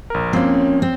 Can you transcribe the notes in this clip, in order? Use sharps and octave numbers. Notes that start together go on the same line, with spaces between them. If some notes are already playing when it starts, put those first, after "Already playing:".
A#1 A#4
F3 A#3 C4 C#4
C4